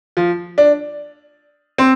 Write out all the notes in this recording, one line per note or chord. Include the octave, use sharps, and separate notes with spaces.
F3
D4
C4